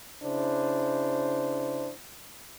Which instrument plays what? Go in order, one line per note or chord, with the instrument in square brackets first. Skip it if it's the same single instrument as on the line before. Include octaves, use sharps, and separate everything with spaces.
[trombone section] C#3 D4 E4 C5